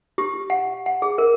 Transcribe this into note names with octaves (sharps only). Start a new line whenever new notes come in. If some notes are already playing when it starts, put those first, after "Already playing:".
G4
F#5
F#5
G#4
A#4